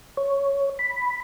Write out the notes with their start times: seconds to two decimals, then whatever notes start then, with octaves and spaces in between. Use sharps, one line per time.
0.17 C#5
0.79 B5